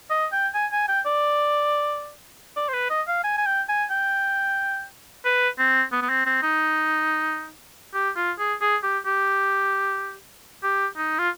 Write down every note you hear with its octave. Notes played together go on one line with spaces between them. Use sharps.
D#5
G5
G#5
G#5
G5
D5
D5
C5
B4
D#5
F5
G#5
G#5
G5
G#5
G5
B4
C4
B3
B3
C4
C4
D#4
G4
F4
G#4
G#4
G4
G4
G4
D#4
F4